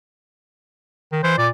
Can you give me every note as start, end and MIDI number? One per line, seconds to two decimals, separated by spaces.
1.12 1.23 51
1.23 1.37 52
1.23 1.38 72
1.38 1.49 46
1.38 1.48 74